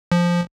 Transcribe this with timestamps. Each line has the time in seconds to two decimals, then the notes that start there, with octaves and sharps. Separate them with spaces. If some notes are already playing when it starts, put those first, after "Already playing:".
0.12 F3